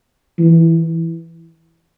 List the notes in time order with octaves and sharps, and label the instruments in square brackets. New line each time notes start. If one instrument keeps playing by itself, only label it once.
[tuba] E3